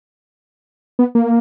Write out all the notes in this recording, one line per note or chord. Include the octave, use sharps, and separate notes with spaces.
B3
A#3